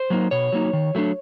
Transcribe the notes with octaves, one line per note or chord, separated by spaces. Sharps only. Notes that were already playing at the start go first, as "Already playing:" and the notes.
Already playing: C5
F#3 A#3 D#4
B2 C#5
F#3 A#3 D#4
D#3
F#3 A3 D4